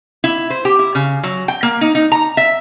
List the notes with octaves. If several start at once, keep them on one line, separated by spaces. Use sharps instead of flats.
E4
C5
G4
E4
C#3
F#3
G5
A#3
D#4
D#4
A#5
E5